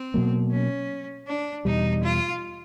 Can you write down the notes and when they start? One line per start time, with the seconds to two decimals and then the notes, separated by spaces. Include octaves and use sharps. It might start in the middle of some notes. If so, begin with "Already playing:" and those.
Already playing: C4
0.14 B2 F#3 A#3
0.52 C#4
1.27 D4
1.65 E2 B2 G3 D#4
2.04 F4